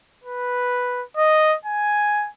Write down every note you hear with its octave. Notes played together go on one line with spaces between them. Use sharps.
B4
D#5
G#5